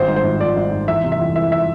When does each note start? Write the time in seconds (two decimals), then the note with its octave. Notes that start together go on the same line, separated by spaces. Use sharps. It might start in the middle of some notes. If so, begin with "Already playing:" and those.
Already playing: G#1 C5
0.08 G#2
0.16 C5
0.24 G#1
0.40 F3 D5
0.57 G#1
0.72 G#2
0.88 E2 E5
1.04 C3
1.12 E5
1.20 E2
1.36 E3 E5
1.52 E5